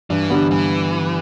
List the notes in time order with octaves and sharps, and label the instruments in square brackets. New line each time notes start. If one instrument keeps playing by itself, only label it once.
[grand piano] G2 [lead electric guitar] E3
[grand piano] D3 G3 B3
[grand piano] G2 [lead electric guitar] E3